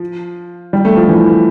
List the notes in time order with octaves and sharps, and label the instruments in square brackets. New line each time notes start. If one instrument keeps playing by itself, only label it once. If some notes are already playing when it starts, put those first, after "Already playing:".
Already playing: [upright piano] F3
G3
A3
F3
E3